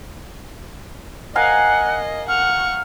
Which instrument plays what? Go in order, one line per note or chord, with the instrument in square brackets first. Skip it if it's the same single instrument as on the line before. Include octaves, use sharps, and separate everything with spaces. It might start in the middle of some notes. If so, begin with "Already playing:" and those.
[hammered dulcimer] A#4 F5 G#5 [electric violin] D#5 [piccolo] F#5
[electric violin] F#5 C#6 [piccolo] F6